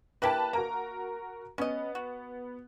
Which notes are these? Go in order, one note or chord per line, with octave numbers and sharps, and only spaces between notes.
A#3 E4 G4 B4 A5
A#3 F#4 A#4 A#5
B3 C#4 D#5
F#4